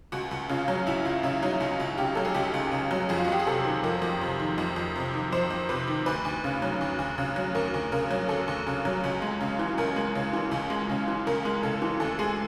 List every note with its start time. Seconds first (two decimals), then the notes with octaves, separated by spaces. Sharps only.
0.12 C#2 F#4
0.31 C#2
0.49 C#3 F4
0.68 F#3
0.87 C#2 E4
1.05 C#2 F4
1.23 C#3 E4
1.43 F#3 D#4
1.60 C#2
1.80 C#2
1.98 C#3 G4
2.15 F#3 A4
2.25 G#4
2.35 C#2 G4
2.54 C#2
2.72 C#3
2.91 F#3
3.09 F2 G#4
3.17 F4
3.25 F#4
3.28 F2 G4
3.39 G#4
3.47 C3 A4
3.65 D#3
3.83 F2 A#4
4.02 F2
4.21 C3
4.40 D#3
4.58 F2
4.76 F2
4.96 C3
5.14 D#3
5.32 F2 C5
5.50 F2
5.69 C3 B4
5.87 D#3
6.06 D2 B4
6.25 D2
6.44 C#3
6.62 F#3
6.81 D2
6.99 D2
7.18 C#3
7.36 F#3
7.55 D2 A#4
7.74 D2
7.92 C#3 A#4
8.11 F#3
8.29 D2 A4
8.48 D2
8.67 C#3
8.85 F#3
9.04 C#2
9.22 G#3
9.41 C#3
9.59 E3
9.78 C#2 A#4
9.96 G#3
10.15 C#3
10.33 E3
10.51 C#2
10.70 G#3
10.90 C#3
11.08 E3
11.27 C#2 A#4
11.45 G#3
11.63 C#3 A4
11.82 E3
12.00 D2 A4
12.19 G#3 G#4